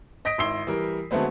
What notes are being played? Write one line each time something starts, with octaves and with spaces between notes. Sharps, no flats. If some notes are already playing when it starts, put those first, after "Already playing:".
D#5 D#6 A#6 B6 D7
G#1 E4 C6 E6 C7 G7
E3 G3 A#4
D3 F#3 G#3 A3 B3 C4